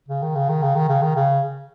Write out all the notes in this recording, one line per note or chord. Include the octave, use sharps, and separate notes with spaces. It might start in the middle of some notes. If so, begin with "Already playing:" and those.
C#3
D#3
C#3
D#3
C#3
D#3
C#3
D#3
C#3